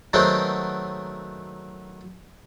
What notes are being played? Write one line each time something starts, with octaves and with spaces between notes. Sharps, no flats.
D#3 F#3 G#3 A3 B3 C4